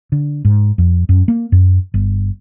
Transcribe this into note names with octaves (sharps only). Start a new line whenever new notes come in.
D3
G#2
F2
F#2
A#3
F#2
G1